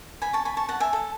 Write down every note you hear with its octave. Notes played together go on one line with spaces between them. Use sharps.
G#5 B5
A5 C#6
G#5 B5
A5 C#6
F#5 A5
E5 G#5
A4